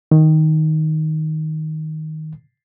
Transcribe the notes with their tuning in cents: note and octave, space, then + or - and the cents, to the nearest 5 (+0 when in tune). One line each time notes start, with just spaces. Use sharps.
D#3 +5